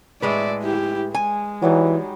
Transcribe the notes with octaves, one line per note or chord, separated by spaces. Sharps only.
A2 G#3 B4 D5 E5
E4 G4
G#3 G#5
E3 F#3 G3 D#4